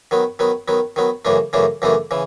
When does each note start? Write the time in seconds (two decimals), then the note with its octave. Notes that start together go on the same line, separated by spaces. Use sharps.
0.11 D#3 F#3 B3
0.39 D#3 F#3 B3
0.68 D#3 F#3 B3
0.96 D#3 F#3 B3
1.25 F#2 C#3 E3 A3 D4
1.53 F#2 C#3 E3 A3 D4
1.82 F#2 C#3 E3 A3 D4
2.11 C#3 E3